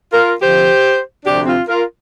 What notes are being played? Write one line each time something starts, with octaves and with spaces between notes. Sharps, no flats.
F4 A#4
F2 D3 F3 G4 C5
D2 C3 F3 D4 G4
C4 F4
F4 A#4